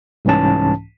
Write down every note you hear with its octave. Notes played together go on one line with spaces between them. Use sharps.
C2 G#2 E3 C#4 A5